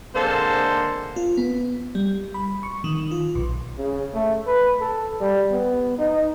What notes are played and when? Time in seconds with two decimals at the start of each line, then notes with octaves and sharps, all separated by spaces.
0.15 D3 G#3 A#3 C4 A4 C5
1.16 F4
1.37 B3
1.95 G3
2.34 B5
2.63 C#6
2.84 D#3
3.11 F4
3.35 B1
3.78 C#3
4.14 A3
4.47 B4
4.81 A4
5.20 G3
5.51 B3
5.98 D#4